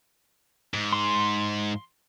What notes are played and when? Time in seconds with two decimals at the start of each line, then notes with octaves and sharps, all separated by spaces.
0.74 G#2
0.93 C6